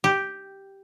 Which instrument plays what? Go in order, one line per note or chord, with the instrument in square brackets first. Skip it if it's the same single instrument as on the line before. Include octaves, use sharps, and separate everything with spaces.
[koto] G4